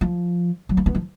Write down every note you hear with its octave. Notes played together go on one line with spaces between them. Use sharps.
F3
F#3
A#3
B3
F3